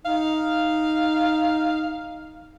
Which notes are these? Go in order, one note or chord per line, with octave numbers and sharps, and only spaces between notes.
D#4 F5